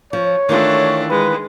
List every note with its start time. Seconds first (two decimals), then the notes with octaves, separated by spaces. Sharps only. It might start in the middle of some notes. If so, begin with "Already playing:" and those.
0.13 F3 C#5
0.49 D#3 E3 A3 D4 F4
1.10 G#3 B4